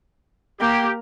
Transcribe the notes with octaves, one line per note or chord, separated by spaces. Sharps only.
A#3 G4